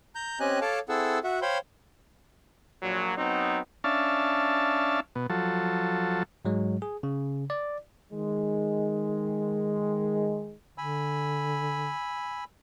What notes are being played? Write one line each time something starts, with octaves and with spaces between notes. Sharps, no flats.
A#5 G6
C4 C#4 G4 D#5 G#5 F#6
A4 C#5 F5 A5 D6
C4 E4 G#4 A4 F#5 E6
F#4 E5 F#5
C5 C#5 F5 G5 B5 C6
A#1 A#2 F#3
F#3 B3 C4 D#4
C#4 D4 E5 F5 A5
B2
F3 F#3 A4
G#2 F#3 G#3
G#4
C#3
D5
D#3 G#3
D3 G#5 B5 E6